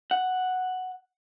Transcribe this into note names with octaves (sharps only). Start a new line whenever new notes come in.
F#5